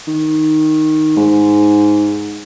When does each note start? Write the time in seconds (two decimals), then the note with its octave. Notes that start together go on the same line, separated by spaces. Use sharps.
0.07 D#3
1.17 G#2